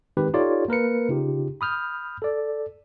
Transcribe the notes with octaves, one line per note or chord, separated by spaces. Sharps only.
D#3 G#3 C4 D#4 G4 B4
D#4 F4 G4 A4 C#5 D5
A#3 A#4 B4 C#7
C#3 D#4 F4 G4
B5 D#6 F6 G6
A4 D5